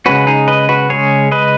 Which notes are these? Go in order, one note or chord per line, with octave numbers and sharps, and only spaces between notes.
C#3 G#3 C#4 F#4 B4
D#4 G#4
B4 D#5
F#4 B4
C#3 G#3 C#4 G#4 C#5
B4 D#5